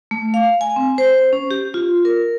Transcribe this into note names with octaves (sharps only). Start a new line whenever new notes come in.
A3
F5
G#5
C4
C5
C#4
G4
F4
A#4